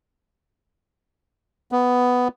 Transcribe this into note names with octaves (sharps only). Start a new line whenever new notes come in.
B3